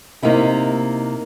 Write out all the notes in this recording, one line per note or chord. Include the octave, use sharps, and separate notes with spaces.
C3 A#3 D#4 E4 G4